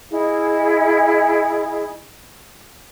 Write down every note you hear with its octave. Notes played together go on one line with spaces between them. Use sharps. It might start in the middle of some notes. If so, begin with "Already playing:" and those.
E4 G#4 D#5 F5